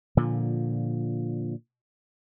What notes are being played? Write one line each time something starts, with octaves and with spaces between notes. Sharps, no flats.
A#2 D3 F3